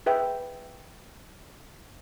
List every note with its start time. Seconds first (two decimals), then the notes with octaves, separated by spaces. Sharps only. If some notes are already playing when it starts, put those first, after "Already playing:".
0.06 G#4 B4 E5 G5